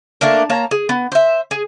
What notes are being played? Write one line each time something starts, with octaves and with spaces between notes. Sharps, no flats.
A3 A#3 D4 A#4
A#3 C#5 A5 A#5
G#4
B3
C5 E5
G#4